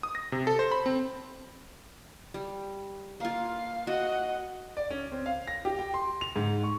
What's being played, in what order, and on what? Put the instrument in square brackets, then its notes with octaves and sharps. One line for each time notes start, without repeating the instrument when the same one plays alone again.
[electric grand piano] D#6
A#6
C3
A4
C5
B5
C4
[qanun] G3
[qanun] A#3 F4 [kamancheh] F5
[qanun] F#4 [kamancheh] D#5 F#5
[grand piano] D5
C#4
C4
F5
A#6
G4
G5
C6
F7
G#2
C#6